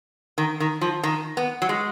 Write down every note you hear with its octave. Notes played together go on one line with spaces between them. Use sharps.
D#3
D#3
F3
D#3
B3
F#3
G#3